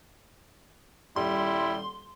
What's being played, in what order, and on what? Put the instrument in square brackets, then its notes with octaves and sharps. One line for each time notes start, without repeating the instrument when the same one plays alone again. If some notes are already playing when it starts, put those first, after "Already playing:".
[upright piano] D#1 [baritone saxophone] G3 [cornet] E4 [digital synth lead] C6